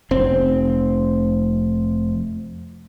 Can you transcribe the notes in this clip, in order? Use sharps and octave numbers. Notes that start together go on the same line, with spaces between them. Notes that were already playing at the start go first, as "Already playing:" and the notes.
F1 C4